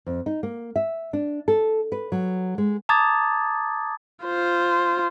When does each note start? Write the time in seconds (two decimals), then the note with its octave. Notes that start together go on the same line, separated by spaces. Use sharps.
0.06 F2
0.26 D#4
0.43 A#3
0.76 E5
1.13 D4
1.48 A4
1.92 B4
2.12 F#3
2.58 G#3
2.89 A5 A#5 D6 D#6 G#6 A6
4.25 F4 C5